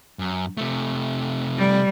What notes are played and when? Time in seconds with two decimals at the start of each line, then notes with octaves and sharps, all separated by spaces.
0.19 F#2
0.58 C3 A3
1.58 G3